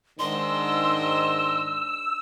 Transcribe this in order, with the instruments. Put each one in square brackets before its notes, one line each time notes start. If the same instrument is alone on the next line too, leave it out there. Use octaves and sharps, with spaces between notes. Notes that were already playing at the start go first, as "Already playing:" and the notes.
[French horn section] G#2 D#3 [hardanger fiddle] D4 D#5 [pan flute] C6 [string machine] E6